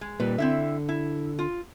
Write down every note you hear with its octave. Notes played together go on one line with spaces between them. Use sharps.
G#3
A#2 G3 B4
D3 C4 E4 E5
E4
F4